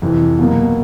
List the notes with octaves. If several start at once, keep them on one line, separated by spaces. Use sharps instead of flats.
F2 C3 E3
B2 F#3 A#3